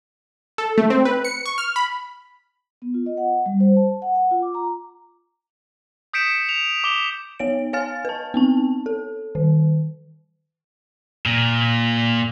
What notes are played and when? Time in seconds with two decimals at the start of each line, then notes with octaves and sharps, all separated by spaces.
0.58 A4
0.78 A3
0.90 C4
1.05 B4
1.24 C#7
1.46 C#6
1.58 F6
1.76 B5
2.82 B3
2.94 F4
3.06 D#5
3.17 F#5
3.46 G3
3.60 C5
3.77 A5
4.02 F#5
4.15 F#5
4.31 F4
4.42 D6
4.54 A#5
6.13 D#6 G6 B6 C#7 D7 E7
6.49 F7
6.84 D6 G7
7.39 B3 C#5 D7
7.73 C#5 F5 G#5 F6 A6
8.05 B4 A5
8.34 B3 C4 A5
8.86 A4
9.35 D#3
11.26 A#2